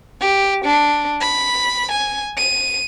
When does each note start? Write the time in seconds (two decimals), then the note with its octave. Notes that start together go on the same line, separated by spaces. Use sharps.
0.21 G4
0.65 D4
1.21 B5
1.92 G#5
2.37 D#7